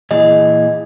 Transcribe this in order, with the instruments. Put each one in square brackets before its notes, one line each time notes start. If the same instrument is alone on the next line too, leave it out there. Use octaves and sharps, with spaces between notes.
[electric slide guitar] A#2 E3 G#4 [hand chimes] D#5